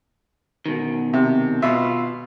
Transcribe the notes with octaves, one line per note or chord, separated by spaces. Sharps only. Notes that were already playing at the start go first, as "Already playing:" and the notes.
B2 D#3
C3
B2 F4 E5